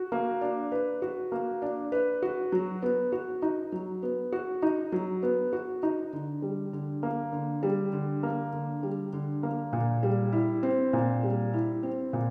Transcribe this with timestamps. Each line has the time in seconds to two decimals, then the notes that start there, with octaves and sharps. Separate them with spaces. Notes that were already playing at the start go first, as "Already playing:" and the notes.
Already playing: F#4
0.12 A#3
0.41 D4
0.72 B4
1.02 F#4
1.32 A#3
1.62 D4
1.92 B4
2.22 F#4
2.52 F#3
2.83 B3
3.12 F#4
3.42 D#4
3.72 F#3
4.03 B3
4.32 F#4
4.62 D#4
4.92 F#3
5.23 B3
5.53 F#4
5.83 D#4
6.13 D3
6.42 G3
6.73 D3
7.03 A#3
7.33 D3
7.63 G3
7.93 D3
8.23 A#3
8.53 D3
8.83 G3
9.13 D3
9.43 A#3
9.73 A#2
10.03 G3
10.33 E4
10.63 C4
10.93 A#2
11.23 G3
11.53 E4
11.83 C4
12.13 A#2